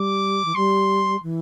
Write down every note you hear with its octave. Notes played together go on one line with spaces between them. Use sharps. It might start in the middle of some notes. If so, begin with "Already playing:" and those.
Already playing: G3 D6
E3
G3 C6
E3